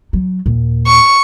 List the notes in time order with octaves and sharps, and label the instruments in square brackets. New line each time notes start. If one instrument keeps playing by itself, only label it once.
[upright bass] F#3
D#2 A#2
[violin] C#6